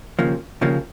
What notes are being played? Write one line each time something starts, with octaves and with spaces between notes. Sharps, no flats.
D#2 C#3 F3 A#3
D#2 C#3 F3 A#3